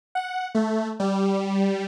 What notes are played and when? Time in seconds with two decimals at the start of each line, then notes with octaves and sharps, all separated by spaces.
0.15 F#5
0.55 A3
1.00 G3